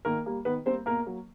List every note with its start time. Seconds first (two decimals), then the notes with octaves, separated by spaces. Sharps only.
0.05 D#3 A#3 A#4
0.26 G3 A#3
0.45 D#3 B3 B4
0.65 G3 A#3 C4 C5
0.86 B2 A#3 A#4
1.06 F#3 A#3